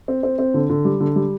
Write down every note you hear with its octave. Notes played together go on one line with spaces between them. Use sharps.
C4
C4
C4
D3
D3
G3
D3
G3